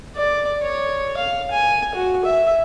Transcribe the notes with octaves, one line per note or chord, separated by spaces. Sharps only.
D5
C#5
F5
G#5
F#4
E5